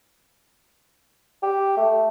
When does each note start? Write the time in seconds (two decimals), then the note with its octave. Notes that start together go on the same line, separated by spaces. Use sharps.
1.43 G4
1.77 A3